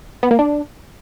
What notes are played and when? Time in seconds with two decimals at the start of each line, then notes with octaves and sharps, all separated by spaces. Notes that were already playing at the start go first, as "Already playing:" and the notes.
0.23 B3
0.31 A#3
0.39 D4